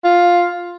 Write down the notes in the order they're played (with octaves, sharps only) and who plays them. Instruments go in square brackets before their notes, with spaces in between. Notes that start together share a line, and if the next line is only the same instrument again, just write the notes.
[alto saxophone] F4